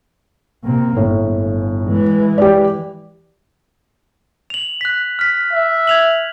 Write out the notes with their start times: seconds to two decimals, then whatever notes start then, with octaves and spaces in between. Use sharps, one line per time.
0.64 C3 A#3
0.97 G1 A2
1.84 E3 G#3
2.38 G4 D5
4.50 F7 F#7
4.81 F#6 B6
5.19 F6 B6
5.53 E5
5.87 G#6 F7 F#7